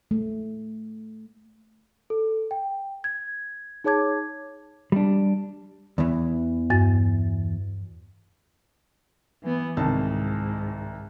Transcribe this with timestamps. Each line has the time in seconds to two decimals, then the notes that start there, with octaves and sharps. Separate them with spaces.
0.11 A3
2.10 A4
2.51 G5
3.04 G#6
3.84 D#4 G#4 C#5 A5 D6 G#6
4.92 G3 D4
5.98 E2 E3
6.70 G2 A6
9.43 E3 B3
9.77 C2 G#2 D#3 A5